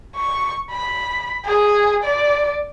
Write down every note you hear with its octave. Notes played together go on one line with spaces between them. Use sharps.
C#6
B5
G#4
D5